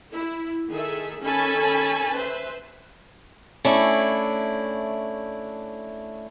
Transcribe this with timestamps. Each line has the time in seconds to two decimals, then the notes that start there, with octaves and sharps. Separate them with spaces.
0.12 E4
0.69 D#3 G#4 A4 E5
1.21 D#3 C#4 A4 G#5 A5 B5
2.13 B4 C5 E5
3.65 A3 C#4 D4 E4